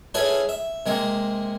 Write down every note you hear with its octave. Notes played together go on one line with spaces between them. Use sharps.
C#4 E4 G#4 A4 B4 C#5
E5
C3 G#3 A#3